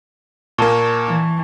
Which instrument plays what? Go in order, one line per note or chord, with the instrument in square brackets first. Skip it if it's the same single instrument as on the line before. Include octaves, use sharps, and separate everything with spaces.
[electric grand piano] A#2 A#3 [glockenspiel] A5 C#6
[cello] E3